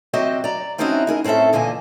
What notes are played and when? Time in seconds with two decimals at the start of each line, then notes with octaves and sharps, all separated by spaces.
0.13 F#3 C4 F#4 G4 D#5 E5
0.44 D5 A#5
0.78 A3 C4 C#4 D#4 E4 F#4
1.07 D#4 G#4 A#4
1.24 A2 C4 C#4 A4 E5
1.53 E2 A#2 D3 D#5 G#5